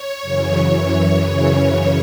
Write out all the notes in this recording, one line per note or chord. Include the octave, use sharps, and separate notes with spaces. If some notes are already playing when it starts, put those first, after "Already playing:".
Already playing: C#5
F#2 C#3 E3
F#2 E3
F#2 C#3 E3 C#5